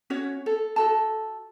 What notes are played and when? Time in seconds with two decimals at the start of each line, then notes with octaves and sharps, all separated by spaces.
0.10 C#4 F#4 C#5 F#5
0.46 A4
0.76 F#4 A4 A5